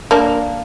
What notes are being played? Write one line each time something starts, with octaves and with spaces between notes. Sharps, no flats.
A#3 D4